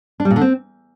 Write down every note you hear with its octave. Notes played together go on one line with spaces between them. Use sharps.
D4
G3
A#2
D3
C4